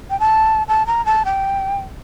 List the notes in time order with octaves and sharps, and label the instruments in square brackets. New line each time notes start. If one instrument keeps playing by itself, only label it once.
[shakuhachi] G5
A5
A5
A#5
A5
G5